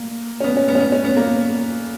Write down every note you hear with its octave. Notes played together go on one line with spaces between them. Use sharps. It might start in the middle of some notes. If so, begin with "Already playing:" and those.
Already playing: A#3
C#4
B3
C#4
B3
C#4
B3
C#4
B3
A#3